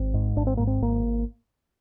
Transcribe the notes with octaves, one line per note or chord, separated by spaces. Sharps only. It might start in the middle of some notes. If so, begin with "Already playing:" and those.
Already playing: G#1 C4
G#2
G#1 D4
C4
G#2 A#3
C4
G#1 A#3